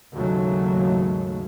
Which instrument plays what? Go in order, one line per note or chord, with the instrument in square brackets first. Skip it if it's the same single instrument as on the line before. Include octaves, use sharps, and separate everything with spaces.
[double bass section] D#2 G#2 C#3 F#3 G#3 A3